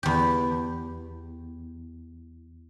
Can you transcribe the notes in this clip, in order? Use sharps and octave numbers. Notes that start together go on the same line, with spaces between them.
E2 G4